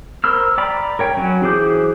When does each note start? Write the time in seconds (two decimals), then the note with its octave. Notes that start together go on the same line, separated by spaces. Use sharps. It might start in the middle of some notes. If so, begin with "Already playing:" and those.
0.24 A#4 C5 B5 E6 F6
0.58 D5 G5 A#5 B5
0.99 A#4 C#5 G5
1.17 F#3 C#4
1.43 E3 G#4 C5 D6 G6